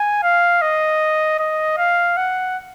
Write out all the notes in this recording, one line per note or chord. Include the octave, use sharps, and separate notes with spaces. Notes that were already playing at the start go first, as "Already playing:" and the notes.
Already playing: G#5
F5
D#5
D#5
F5
F#5